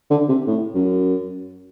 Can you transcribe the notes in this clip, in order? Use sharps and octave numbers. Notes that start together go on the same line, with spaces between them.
D3
C3
A2
F#2